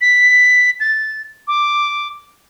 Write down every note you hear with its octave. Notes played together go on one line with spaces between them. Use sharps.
B6
A6
D6